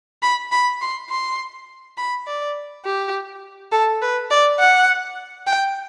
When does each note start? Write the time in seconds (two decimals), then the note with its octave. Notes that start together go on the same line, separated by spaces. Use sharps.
0.22 B5
0.52 B5
0.81 C6
1.10 C6
1.98 B5
2.27 D5
2.85 G4
3.72 A4
4.02 B4
4.31 D5
4.59 F#5
5.47 G5